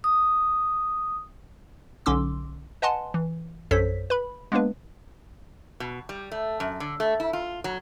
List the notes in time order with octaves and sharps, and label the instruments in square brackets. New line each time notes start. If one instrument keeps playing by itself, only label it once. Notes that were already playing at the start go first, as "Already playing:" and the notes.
[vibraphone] D#6
[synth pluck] B1 D3 C#4 C6 D6 E6
B4 D#5 F#5 G#5 A5 C6
E3
A#1 F#2 A4 C5 C#5 B6
B4 B5
G#3 A#3 B3 D4 B4
[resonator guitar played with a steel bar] B2
G3
A3
F#2
D3
A3
E4
F4
F#3